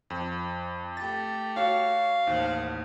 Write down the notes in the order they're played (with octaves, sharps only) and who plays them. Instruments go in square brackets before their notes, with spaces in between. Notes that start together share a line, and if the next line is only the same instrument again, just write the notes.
[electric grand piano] F2
[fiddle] A3 G4 [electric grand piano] A6
[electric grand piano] F#4 C#5 [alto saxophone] F5
[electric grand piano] A1 D#2 [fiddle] C5 F#5